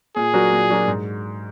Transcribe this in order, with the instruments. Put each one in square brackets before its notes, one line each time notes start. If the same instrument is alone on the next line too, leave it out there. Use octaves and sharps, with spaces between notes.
[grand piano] A#2 [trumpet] G#4
[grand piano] F#3 D4 F#4 A#4
A#2
F#3 D4 F#4 A#4
G#2